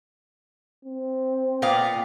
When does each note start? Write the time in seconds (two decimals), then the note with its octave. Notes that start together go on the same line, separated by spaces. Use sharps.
0.85 C4
1.62 A#2 B3 F5 G5 D#6 F6